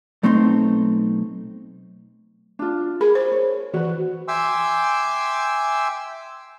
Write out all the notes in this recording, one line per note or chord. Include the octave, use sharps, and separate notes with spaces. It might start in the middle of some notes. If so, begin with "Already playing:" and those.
B1 A3 C4 D#4 C6
D4 F4
G#4 A#4 B5
C5
C#5
E3 F#4 B4
E5 G5 G#5 C6 D6 E6